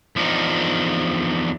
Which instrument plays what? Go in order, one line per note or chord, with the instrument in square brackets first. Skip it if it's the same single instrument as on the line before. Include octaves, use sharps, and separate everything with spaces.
[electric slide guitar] E2 F3 D4 D#4